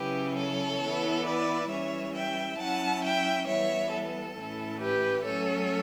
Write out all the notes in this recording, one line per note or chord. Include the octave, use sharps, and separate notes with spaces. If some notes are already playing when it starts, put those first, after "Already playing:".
Already playing: C#3 F#3 C#4 E4 G4 B4
A4 C#5
E3 B3 E4
B4 D5
E3 G3 C#4 C#5 E5
E5 G5
F#3 C#4 E4 F#5 A5
E5 G5
E3 G3 B3 C#5 E5
A4
A2 E3 A3 C#4 E4
G4 B4
F#3 A3 C#4 A4 C#5